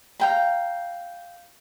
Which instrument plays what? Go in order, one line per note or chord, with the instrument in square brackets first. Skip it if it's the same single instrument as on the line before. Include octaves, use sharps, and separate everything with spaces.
[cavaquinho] F5 G5 A#5